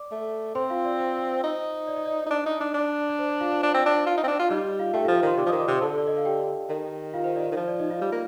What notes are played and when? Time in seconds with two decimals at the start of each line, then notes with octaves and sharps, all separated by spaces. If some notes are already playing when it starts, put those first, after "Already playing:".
Already playing: D5 D6
0.12 A3
0.55 C4 C5 C6
0.70 F4 F5
0.85 D5
0.99 C5
1.18 C5
1.44 D#4
1.88 D5
1.96 D#5
2.06 D5
2.26 D#4
2.30 D4
2.46 D#4
2.60 D4
2.74 D4
3.09 D5
3.19 C5
3.29 D5
3.40 F4 F5
3.52 C5
3.62 D4 D5
3.74 C4
3.86 D4
4.06 F4
4.17 D#4
4.23 C4
4.28 D4
4.39 F4
4.50 G3 D#4 D#5
4.64 D5
4.79 F4 F5
4.93 A3 G4 G5
5.05 F4 F5
5.08 F3
5.16 F4 F5
5.23 D#3 C5 C6
5.37 C3 D5 D6
5.46 F3 D#5 D#6
5.52 D#3
5.60 D5 D6
5.68 C3 C5 C6
5.81 D3 A4 A5
5.98 D5
6.07 D#5
6.17 F5
6.25 G4 G5
6.69 D#3
7.14 F4 F5
7.24 C5
7.36 D5
7.46 C5
7.52 D#3
7.57 F3
7.68 D5
7.80 D#4 D#5
7.90 F4 F5
8.01 G3
8.12 A#3